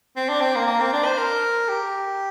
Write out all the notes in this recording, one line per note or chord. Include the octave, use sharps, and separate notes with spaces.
C4
D4
C4
A#3
A#3
C4
D4
C5
A#4
G4